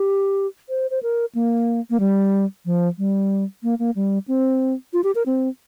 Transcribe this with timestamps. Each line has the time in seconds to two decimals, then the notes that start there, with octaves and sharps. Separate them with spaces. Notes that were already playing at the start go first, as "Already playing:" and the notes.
Already playing: G4
0.69 C5
0.91 C5
1.03 A#4
1.35 A#3
1.90 A#3
2.00 G3
2.65 F3
2.98 G3
3.63 A#3
3.79 A#3
3.96 G3
4.28 C4
4.93 F4
5.04 G4
5.15 A#4
5.26 C4